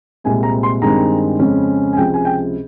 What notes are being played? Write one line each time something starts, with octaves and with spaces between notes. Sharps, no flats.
C2 A#2 G#3 C4 G#5
A#5
C6
G2 D#3 G#3 C4 A#5
F2 C#3 G#3 C#4
G#5
C#2 C3 F3 G5
G#5
G5